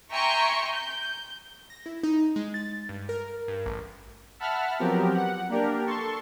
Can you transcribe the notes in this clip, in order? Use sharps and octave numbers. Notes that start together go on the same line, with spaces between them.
E5 G5 G#5 A#5 C6 C#6
G6
A#6
E4
D#4
G#3
A6
G2
A#4
G2
A1
E5 F#5 A5 B5 F6
F3 F#3 B3 C4 G4 A#4
F#5
A#3 D4 G4 A#4
A4 A5 C6 C#6